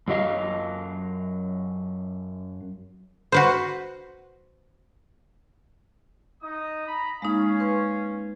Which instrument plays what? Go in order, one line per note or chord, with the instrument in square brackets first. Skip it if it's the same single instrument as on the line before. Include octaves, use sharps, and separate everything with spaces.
[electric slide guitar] F#2 F#3 D#5 F5
[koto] F#4 B4 C5
[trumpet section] D#4 D#6
A#5 B5
[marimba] G#3 A#3 D#4 [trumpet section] C#4 F5
[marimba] B4 C6 G#6